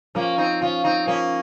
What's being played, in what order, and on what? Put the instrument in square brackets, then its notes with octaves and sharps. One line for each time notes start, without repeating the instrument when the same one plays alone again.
[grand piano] F3 [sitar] A#3 C#4
[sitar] C4 D#4
[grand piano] F3 [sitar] C#4 F4
[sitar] C4 D#4
[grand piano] F3 [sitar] A#3 C#4